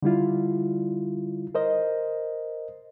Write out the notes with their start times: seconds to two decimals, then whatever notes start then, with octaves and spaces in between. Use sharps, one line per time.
0.03 D3 G3 E4 F4
1.55 A#4 C5 D#5